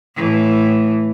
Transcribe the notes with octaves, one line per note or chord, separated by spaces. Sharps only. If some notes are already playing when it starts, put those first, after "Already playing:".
A2 E3